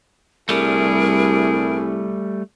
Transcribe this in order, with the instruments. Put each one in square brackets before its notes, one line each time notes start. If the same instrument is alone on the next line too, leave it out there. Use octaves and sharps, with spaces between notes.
[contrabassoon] C2 [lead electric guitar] G3 A3 [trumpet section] D4 E4 G#4 [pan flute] A#4